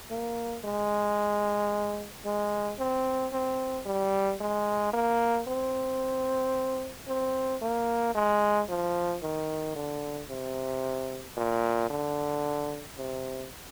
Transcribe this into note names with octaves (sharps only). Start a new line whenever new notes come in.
A#3
G#3
G#3
C4
C4
G3
G#3
A#3
C4
C4
A#3
G#3
F3
D#3
D3
C3
A#2
D3
C3